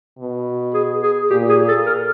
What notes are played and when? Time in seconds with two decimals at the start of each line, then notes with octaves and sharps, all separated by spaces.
0.19 B2
0.74 G#4
1.03 G#4
1.30 A#2 G4
1.49 G#4
1.68 A4
1.86 A#4